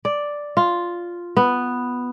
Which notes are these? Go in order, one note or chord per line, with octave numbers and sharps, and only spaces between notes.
D5
F4
B3